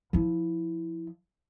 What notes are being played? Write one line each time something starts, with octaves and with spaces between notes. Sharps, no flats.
F3 E4